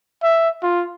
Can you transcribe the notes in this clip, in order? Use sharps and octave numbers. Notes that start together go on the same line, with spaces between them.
E5
F4